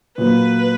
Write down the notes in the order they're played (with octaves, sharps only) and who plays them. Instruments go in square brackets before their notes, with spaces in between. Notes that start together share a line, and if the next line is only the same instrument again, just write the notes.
[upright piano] A#2 F#3 A#3 [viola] B4